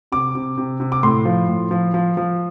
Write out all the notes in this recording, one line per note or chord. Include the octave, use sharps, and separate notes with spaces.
C3 D6
C3
C3
C3
D6
A2 C6
F3
A2
F3
F3
F3